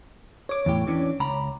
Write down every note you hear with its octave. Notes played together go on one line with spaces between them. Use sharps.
C#5 D6
E2 A2 G4
E3 C#4 D4
C#2 A#5 B5